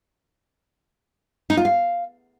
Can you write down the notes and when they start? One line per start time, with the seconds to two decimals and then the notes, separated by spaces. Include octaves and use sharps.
1.50 D#4
1.57 F4
1.65 F5